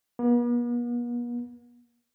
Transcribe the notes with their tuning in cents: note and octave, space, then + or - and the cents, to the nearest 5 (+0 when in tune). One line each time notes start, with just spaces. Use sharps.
B3 -45